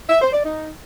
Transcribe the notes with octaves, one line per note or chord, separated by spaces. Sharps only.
E5
C5
D5
D#4